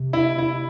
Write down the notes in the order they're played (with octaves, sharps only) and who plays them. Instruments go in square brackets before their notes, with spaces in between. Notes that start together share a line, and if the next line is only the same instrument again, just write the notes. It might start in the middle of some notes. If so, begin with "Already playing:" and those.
Already playing: [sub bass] C3
[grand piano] E4
E4